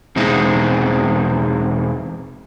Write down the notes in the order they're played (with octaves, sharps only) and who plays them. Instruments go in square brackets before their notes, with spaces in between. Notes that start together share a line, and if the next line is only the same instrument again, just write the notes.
[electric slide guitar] E2 B2 G#3 C4 D#4